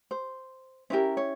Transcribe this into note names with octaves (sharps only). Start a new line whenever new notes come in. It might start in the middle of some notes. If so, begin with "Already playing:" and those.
C5
C#4 E4 G4 A#4 C5
C#5